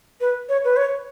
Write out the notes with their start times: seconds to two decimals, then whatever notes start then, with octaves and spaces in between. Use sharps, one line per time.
0.21 B4
0.49 C#5
0.65 B4
0.77 C#5